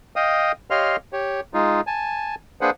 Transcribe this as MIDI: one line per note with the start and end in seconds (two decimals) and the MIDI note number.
0.16 0.52 75
0.16 0.52 77
0.16 0.52 79
0.16 0.52 87
0.70 0.96 67
0.70 0.96 73
0.70 0.96 75
0.70 0.96 77
0.70 0.96 84
0.70 0.96 89
1.13 1.41 67
1.13 1.41 73
1.54 1.81 56
1.54 1.81 63
1.54 1.81 65
1.87 2.35 80
1.87 2.35 81
2.61 2.70 58
2.61 2.70 62
2.61 2.70 68
2.61 2.70 71
2.61 2.70 72
2.61 2.70 78